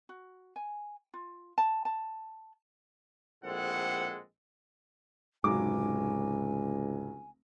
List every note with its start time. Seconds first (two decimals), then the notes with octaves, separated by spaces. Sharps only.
0.09 F#4
0.56 G#5
1.14 F4
1.58 A5
1.85 A5
3.43 A#1 A2 G#3 C4 A4 F#5
5.44 F1 C#2 G#2 F#3 G#5 D6